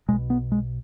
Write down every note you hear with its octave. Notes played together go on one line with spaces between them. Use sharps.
B1 B2 G#3
B3
G#3